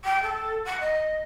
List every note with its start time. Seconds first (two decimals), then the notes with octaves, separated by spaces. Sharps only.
0.04 G5
0.22 A4
0.65 F#5
0.80 D#5